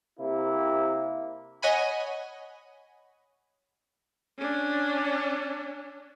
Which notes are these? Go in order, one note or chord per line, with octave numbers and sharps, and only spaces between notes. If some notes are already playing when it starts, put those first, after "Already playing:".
C3 A#3 E4
C#5 D#5 F#5 G#5 B5
C#4 D4